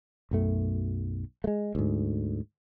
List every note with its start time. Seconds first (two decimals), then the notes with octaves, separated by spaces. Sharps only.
0.31 B1 F#2 A3
1.44 G#3 A3
1.75 D2 G#2